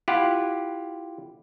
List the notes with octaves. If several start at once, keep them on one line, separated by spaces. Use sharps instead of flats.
E4 F4 G4 F#5